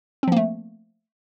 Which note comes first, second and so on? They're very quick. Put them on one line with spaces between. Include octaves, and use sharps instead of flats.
C4 F3 A#3 A3